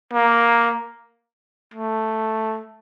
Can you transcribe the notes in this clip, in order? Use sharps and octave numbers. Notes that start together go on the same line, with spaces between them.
A#3
A3